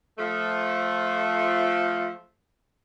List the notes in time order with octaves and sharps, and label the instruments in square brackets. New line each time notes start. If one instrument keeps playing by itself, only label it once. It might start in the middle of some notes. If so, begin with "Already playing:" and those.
[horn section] F3 A3